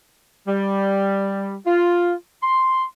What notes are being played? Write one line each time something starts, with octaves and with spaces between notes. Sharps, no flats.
G3
F4
C6